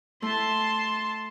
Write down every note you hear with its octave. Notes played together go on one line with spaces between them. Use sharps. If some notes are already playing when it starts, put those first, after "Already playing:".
A3 E4 A5 C6